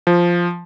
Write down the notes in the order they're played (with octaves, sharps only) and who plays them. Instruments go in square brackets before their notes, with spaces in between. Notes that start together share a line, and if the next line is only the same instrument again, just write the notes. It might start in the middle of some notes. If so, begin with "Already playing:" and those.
[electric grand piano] F3